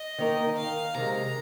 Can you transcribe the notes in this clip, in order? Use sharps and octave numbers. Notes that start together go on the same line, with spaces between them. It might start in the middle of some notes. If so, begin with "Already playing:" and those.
Already playing: D#5
D#3 A#3 D#4 A#4
F5
C3 D#3 G#3 A#5